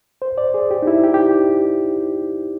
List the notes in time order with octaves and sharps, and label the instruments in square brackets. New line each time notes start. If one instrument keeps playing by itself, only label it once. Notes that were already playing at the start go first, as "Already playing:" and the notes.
[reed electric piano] C5
D5
G#4
G4
D#4
E4
G4
G4